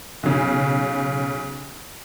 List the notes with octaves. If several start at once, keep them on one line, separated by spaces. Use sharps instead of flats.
B1 C#3